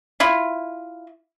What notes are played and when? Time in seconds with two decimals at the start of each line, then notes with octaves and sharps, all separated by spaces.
0.20 E4 F4